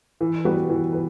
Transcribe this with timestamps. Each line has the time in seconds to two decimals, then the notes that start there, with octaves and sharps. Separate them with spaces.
0.21 E3
0.45 G3 B3 F#4 B4
0.70 E3
0.93 B4